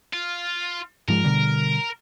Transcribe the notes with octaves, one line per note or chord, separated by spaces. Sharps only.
F4
G#2 F3 G#3 A#4
B2 D3 G3